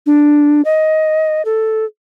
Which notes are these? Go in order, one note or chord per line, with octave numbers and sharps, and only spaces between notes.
D4
D#5
A4